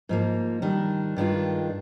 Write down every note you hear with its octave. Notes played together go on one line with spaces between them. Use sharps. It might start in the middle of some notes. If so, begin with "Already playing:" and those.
G#2 F3 A#3
D#3 G3 D4
G2 D#3 G#3 D4 F4